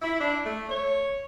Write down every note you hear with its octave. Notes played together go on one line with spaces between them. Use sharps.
E4
D4
A3
C#5